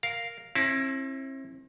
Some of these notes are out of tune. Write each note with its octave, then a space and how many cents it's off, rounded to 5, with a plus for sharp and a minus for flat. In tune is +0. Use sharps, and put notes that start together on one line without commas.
A#4 +0 F5 +0
C4 +45 E4 +0 A5 -25